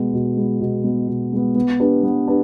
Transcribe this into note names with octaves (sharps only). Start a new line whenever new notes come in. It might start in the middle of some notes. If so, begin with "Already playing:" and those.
Already playing: B2 G#3 B3
B2
G#3 B3
B2
G#3 B3
B2
G#3 B3
B3
D4 G4 B4
B3
D4 G4 B4